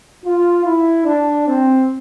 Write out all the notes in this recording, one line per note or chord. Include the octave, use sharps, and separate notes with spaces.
F4
E4
D4
C4